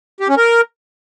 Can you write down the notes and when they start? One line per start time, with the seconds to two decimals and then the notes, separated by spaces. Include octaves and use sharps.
0.20 G4
0.29 C#4
0.37 A#4